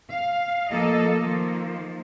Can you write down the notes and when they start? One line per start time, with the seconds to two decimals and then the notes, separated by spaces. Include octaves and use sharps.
0.11 F5
0.70 F3 A#3 A4 D#5
1.19 D#3 F3 A#3